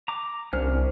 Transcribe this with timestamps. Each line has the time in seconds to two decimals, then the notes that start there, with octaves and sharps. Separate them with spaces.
0.08 A#5 D6
0.53 C2 C#4 D4 C5 F6